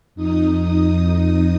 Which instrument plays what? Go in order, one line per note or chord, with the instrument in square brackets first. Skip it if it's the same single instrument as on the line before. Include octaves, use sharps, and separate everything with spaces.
[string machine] F2 D#4 D#6